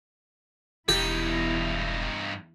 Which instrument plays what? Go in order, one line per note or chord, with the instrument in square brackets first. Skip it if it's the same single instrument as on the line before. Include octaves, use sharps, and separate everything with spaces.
[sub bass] E1 [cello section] E2 E4 [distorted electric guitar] G2 D#4 [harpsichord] G4